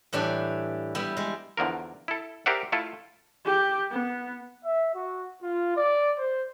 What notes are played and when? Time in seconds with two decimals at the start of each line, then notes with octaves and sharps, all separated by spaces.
0.13 A2 E3 G3 D4 D5
0.95 G3 B3 E4
1.17 G3 G#3
1.57 E2 D3 F3 A#4
2.08 E4 A4
2.46 G4 A#4 C5 D5 E5 F#5
2.72 A3 E4 F4 A4
3.46 G4
3.91 B3
4.64 E5
4.95 F#4
5.41 F4
5.76 D5
6.19 C5